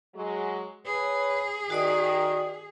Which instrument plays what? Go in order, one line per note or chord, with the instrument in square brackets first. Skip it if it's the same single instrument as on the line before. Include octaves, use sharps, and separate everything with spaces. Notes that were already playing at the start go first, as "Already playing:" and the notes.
[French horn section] F#3 G#3
[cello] G#4 [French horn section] B4 C#5
[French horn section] D#3 [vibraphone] F#4 D5 D#6